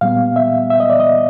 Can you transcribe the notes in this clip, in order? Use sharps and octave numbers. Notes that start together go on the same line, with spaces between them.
A#2 G3 B3 F5
E5
E5
D#5
D5
D#5